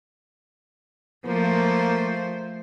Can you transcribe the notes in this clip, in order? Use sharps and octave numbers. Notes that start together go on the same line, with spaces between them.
F3 A3 A#3 C5